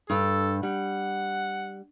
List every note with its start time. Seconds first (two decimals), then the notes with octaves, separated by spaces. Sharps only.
0.10 G2 A4
0.63 G3 F#5